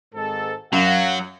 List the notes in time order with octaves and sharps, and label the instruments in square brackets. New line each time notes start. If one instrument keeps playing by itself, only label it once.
[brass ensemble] G#1 G#2 A4
[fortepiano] F#2 [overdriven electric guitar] F#3 [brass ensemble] F5 F#5